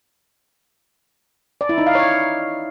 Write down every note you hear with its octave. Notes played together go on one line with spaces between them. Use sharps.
D5
E4
D#4
F5
C#5